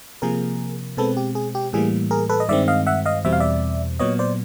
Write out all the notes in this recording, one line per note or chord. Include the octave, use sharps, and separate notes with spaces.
C3 F3 A#3 G#4 A#4
B2 G#3 C4 A4 B4
G4
G#4
G4
A2 E3 G3 A#3 G#4
G#4 A#4
A4 B4
D#5
G2 D#3 G#3 C4 D5 E5
D#5 F5
E5 F#5
D#5 F5
E2 B2 G3 C4 E5
F5
D5 E5
A#2 F#3 B3 C#5 D#5
C5 D5